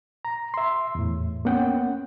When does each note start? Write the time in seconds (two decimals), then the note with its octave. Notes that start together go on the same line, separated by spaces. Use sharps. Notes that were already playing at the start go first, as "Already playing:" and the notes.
0.25 A#5
0.54 E5 C6
0.95 E2 A2
1.45 A#3 B3 C#4 F#5 G5